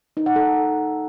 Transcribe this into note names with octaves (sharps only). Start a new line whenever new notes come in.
D#4
F#5
A4